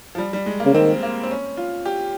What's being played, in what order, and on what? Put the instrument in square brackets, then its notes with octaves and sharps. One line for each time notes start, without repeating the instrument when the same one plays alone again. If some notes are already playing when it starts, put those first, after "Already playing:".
[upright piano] F3
G3
G3
G#3
A#3
[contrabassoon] C#3
[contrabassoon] D#3 [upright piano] C4
[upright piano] A#3
C4
C#4
F4
G4